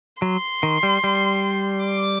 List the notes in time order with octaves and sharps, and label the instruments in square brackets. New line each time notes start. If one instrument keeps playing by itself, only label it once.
[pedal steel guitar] F#3 [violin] C6
[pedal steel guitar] D#3
G3
G3
[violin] D6